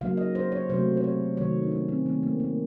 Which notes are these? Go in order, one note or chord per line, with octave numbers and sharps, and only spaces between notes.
C#3 F#3 A#3 F5
D#5
C5
C#5
C3 F#3 A3 C5
C5
C#5
C3 D#3 F#3 A3 C#5
D#4
C#4
C4
D#3 A3 C4
A#3
A#3